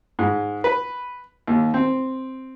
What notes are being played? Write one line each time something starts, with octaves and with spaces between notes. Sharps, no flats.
G#2
B4
D#2
C4